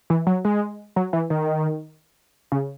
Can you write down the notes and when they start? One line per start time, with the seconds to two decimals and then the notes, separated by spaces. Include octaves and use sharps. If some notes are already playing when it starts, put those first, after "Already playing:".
0.10 E3
0.27 F#3
0.45 G#3
0.96 F#3
1.13 E3
1.30 D#3
2.52 C#3